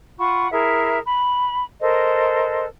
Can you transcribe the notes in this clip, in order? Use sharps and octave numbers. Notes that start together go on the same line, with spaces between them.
F4 F#5 B5 C#6
E4 G#4 A#4 E5
B5
A4 A#4 C5 D#5